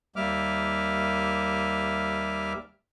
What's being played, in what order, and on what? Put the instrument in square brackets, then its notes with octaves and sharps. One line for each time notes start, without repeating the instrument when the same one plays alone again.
[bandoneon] D#2 G3 A#3 E5 D6 F6